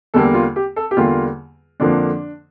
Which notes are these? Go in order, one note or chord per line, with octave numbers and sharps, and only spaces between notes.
E2 D3 G3 A#3 A4
F4
G4
A4
G4
E2 D3 G3 A#3 F4
F2 D3 F3 A#3 D4